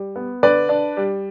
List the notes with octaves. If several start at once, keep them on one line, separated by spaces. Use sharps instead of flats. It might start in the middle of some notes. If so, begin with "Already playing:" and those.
Already playing: G3
B3
D3 B4 D5
D4
G3